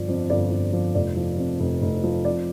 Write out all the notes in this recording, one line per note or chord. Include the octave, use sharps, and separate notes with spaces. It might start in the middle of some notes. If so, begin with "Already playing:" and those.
Already playing: G1 F3 D5
F2
G1 D5
G1
F3
F1 D5
F3
F2
F1
F1
F3
F2 D5